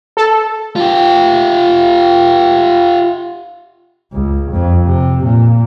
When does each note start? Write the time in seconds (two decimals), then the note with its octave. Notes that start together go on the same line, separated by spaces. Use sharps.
0.17 A4
0.76 F4 G4
4.13 C#2
4.51 F2
4.86 C3
5.23 A#2